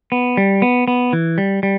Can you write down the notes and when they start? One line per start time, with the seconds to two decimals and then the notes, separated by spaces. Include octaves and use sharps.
0.12 B3
0.37 G3
0.62 B3
0.88 B3
1.13 E3
1.38 G3
1.63 G3